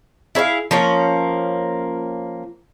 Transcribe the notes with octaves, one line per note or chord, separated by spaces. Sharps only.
E4 G#4 C#5 F5
F3 A#3 C#4